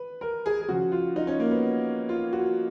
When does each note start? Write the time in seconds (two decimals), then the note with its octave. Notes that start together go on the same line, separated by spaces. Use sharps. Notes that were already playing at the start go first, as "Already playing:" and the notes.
Already playing: B4
0.21 A#4
0.46 G#4
0.61 G#4
0.68 C#3 F3 F#4
0.92 F4
1.16 D#4
1.27 C#4
1.40 A#3
1.51 B3
2.09 F4
2.33 F#4